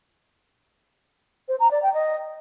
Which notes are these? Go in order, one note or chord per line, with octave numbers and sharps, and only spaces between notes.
C5
A#5
D5
G5
D#5